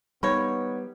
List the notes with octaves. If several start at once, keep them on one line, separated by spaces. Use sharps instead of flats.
D#3 G3 A#3 B3 C#5 B5